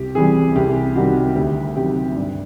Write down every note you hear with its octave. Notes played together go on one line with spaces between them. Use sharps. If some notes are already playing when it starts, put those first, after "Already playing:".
Already playing: C2 G4
C3 E3 G3 G#4
C2 G4
C3 D#3 G3 F#4
D2 G4
C3 D#3 F#3 G4
G2 D4